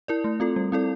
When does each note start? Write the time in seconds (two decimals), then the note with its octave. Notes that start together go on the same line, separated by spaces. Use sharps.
0.08 E4 A#4 D5
0.24 A3
0.40 C4 F4 A4
0.56 G3
0.72 C4 E4 A4 D5